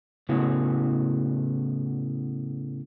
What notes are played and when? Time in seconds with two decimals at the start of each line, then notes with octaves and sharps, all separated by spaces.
0.29 A2 C#3 B3 E4 F#4